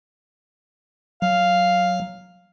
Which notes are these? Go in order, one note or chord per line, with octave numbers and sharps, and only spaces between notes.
F#3 F5